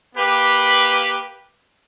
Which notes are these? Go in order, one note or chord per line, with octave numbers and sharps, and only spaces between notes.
A#3 G4 B4